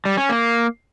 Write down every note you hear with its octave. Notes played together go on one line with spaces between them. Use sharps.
G3
C#4
A#3